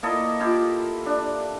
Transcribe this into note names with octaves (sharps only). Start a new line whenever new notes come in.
A#3 E4 A4 D#5
E4 F4 G4
D4